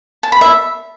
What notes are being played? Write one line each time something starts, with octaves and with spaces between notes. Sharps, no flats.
A5
B5
E5